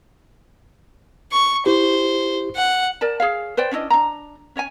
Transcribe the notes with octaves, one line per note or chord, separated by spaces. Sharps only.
C#6
E4 G4 C5
F#5
A#4 D5 A5
G#4 C#5 F5
B4 C5 D5 G5
C#4 D4 E4 D#5
D4 A#5
C#4 C#5 D#5 G#5